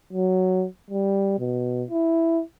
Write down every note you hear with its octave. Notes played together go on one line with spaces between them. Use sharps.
F#3
G3
B2
E4